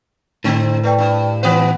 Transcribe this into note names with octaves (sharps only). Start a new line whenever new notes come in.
A2 D3 C4
A3 B4 D5 G5
G2
D#3 B3 B4 F#5 D#6